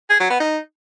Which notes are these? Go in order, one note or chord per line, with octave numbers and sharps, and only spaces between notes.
G#4
F#3
B3
D#4